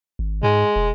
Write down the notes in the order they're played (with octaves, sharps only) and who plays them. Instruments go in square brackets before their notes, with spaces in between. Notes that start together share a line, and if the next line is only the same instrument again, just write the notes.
[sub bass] G#1
[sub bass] G#2 [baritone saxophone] G#3
[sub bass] E1